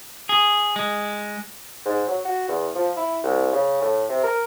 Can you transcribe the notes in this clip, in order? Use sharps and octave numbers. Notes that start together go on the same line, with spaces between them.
G#4
G#3
G#2
F#3
F#4
E2
F3
E4
C2
C#3
A2
C3
A#4